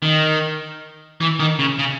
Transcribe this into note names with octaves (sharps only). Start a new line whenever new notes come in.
D#3
E3
D#3
C#3
C#3